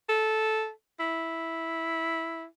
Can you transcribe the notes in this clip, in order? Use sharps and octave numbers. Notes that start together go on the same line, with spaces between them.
A4
E4